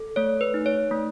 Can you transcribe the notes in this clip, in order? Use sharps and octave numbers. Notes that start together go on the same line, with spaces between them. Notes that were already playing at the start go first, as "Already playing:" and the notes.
Already playing: A4
A3 C#5
B4
D#4
C#5
A3